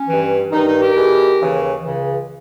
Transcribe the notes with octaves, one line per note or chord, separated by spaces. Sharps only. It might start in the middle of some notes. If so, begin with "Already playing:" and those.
Already playing: C#4
G2 E3
G2 D#3 D#4
D#4
G4 A#4
E2 B2
D#2 C#3 E3
C#2 C#3 E3